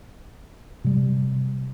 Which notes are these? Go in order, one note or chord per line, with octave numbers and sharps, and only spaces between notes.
C3 G3